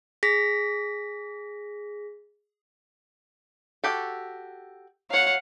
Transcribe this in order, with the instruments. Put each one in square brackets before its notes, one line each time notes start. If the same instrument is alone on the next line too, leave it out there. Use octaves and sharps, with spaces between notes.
[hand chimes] G#4 A#6 B6
[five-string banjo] F#4 G4 A4
[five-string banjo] F#3 C#5 [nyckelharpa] F5 F#5